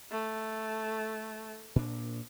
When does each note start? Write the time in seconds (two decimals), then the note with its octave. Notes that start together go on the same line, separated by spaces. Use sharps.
0.11 A3
1.76 A#2 D4